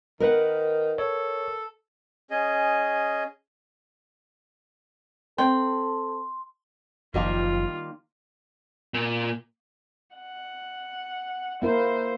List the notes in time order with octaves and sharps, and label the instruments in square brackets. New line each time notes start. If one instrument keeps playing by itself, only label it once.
[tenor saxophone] D#3 [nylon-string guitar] A#4 B4 F#5
[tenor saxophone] A4 [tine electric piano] C#5
[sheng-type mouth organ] C#4 G#4 D#5
[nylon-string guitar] C4 [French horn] A4 [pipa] G5 [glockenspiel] C6
[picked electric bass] F#1 F3 [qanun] D#3 G3 A#3 [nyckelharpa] F4
[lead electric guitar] A#2
[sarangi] F#5
[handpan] A#3 E4 A#4 [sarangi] C5